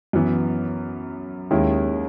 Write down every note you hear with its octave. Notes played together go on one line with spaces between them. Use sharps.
F#2 E3 B3
D#2 D#3 G#3 C#4 E4